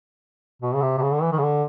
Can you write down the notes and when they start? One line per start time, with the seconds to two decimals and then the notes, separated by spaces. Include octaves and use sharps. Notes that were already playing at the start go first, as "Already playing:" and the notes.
0.62 B2
0.74 C#3
0.82 C3
0.98 C3
1.02 C#3
1.13 D3
1.22 E3
1.32 D#3
1.38 C#3
1.43 D3